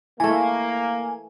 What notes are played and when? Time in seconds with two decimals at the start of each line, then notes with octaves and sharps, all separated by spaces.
0.20 E3 A3 A#3 G#5